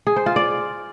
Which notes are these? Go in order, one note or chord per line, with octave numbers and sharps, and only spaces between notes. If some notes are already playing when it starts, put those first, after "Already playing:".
G#4
C5
F4
D5